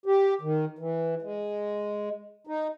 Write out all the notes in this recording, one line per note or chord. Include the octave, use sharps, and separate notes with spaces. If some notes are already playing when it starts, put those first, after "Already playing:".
G4
D#3
E3
G#3
D#4